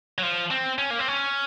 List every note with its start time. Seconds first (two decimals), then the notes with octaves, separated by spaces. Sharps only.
0.18 F#3
0.23 F3
0.51 C4
0.78 C#4
0.90 A#3
0.99 C4
1.08 C#4